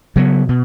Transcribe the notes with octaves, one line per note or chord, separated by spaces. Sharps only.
C#3 F#3 B3
B2